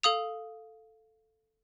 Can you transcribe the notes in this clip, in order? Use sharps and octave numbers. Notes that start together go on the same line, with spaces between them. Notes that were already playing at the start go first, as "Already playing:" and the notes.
A4 F5 D#6 F7